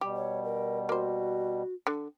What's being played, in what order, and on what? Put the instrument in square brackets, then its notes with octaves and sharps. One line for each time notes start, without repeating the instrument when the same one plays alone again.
[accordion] B2 G3 [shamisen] G4
[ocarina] C#5
A#4
[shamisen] A#3 C5 [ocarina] F#4
[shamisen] D3